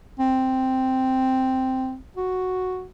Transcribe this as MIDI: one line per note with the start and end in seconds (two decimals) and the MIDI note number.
0.19 1.97 60
2.16 2.85 66